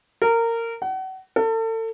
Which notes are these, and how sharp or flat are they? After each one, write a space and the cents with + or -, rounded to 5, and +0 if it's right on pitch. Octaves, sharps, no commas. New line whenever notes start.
A#4 -20
F#5 +35
A4 +35